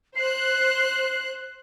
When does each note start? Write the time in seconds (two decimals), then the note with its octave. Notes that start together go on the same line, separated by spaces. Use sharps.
0.16 C5 F#6 C7